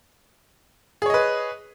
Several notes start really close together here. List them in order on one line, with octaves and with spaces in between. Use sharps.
G#4 C#5 D#5 B4